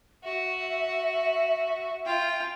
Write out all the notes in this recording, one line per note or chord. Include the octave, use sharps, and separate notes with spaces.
F#4 E5
F4 G5